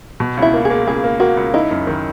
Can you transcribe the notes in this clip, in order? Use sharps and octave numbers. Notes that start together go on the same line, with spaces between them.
B2
C#2
E4
A#3
G#4
A#3
C#2 G#4
A#3
A#3 F#4
C#2
D#4 E4
F#2
D#3